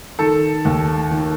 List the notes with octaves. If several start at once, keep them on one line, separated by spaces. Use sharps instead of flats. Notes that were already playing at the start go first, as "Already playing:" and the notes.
D#3 A4
D#2
D#3